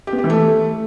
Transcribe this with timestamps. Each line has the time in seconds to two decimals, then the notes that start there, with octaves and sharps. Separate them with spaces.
0.07 G4
0.13 B3
0.18 G4
0.24 E3
0.30 A3